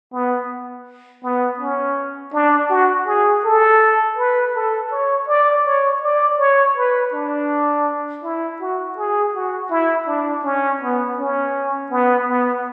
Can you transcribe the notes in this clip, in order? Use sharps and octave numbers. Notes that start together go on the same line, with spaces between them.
B3
B3
C#4
D4
F#4
G#4
A4
B4
A4
C#5
D5
C#5
D5
C#5
B4
D4
E4
F#4
G#4
F#4
E4
D4
C#4
B3
C#4
B3
B3